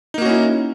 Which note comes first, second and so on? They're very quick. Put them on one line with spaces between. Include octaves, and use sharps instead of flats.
D#4 A#3 F#4 C#4 E4